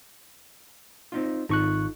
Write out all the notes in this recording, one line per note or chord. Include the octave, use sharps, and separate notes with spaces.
C4 D#4 F4
G#1 D#4 F4 A4 C#6 F#6